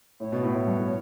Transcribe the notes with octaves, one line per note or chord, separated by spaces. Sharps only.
A2 C#5
B2
A2
A2 C#5
G2
A2